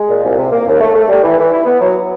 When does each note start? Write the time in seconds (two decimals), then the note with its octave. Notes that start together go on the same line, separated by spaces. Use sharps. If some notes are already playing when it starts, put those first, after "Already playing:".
Already playing: G#3
0.09 A#2
0.23 C2
0.38 C3
0.52 A#3
0.67 D#2
0.80 A3
0.94 A3
1.09 G3
1.23 E3
1.38 E3
1.52 E4
1.66 B3
1.80 F#3